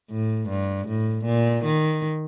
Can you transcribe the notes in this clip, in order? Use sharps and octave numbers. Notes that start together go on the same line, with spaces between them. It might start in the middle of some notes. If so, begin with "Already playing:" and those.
A2
G2
A2
A#2
D#3